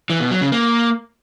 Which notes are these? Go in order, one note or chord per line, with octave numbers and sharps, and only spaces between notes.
E3
B2
F#3
C#3
A#3